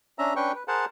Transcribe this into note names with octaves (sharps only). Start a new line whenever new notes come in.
C#4 D4 E5 A#5
C#4 D4 B4 G5 C#6
B4
G#4 A#4 C5 F#5 A5